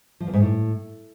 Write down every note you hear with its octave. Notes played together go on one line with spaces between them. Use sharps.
F3
E2
G#2
A2